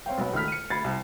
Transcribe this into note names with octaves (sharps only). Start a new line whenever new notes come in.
C4 C#5 F5 G5
B1 B3
C#2 D#3 A3 F6 B6
C#7 D#7
D2 B5 G#6 A6 C7
C2